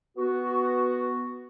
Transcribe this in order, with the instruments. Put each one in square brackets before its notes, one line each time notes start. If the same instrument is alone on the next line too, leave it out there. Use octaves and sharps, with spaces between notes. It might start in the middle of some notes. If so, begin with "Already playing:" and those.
[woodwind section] B3 F#4